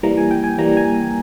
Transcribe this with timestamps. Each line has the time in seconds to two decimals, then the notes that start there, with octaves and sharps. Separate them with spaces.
0.03 E3 G3 A#3 A#5
0.18 G#5
0.31 G5
0.44 G#5
0.58 E3 G3 A#3 A#5
0.77 G#5